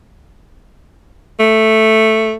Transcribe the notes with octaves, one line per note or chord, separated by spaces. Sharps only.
A3